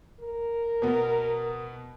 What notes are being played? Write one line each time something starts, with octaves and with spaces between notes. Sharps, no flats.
A#4
B2 B3